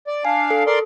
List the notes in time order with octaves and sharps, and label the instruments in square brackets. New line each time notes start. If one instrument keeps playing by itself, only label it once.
[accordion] D5
[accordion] D4 F5 [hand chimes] G#5
[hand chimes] A4
[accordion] A#4 D5 C6